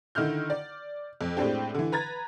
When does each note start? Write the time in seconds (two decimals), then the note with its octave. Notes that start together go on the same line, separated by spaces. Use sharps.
0.15 D3 D#3 E4 F6 G6
0.50 D5
1.21 F2
1.37 A2 G#3 C4 D4 G4
1.74 D3 E3
1.92 B4 A#5 G#6 A6